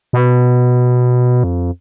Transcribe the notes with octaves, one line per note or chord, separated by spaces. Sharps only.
B2
F2